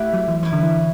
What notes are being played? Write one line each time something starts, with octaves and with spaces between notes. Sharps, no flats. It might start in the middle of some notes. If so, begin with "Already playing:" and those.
Already playing: A3 E4 G4 B4 F#5
F#3
E3
E3 C#4 E4 B4
D3
E3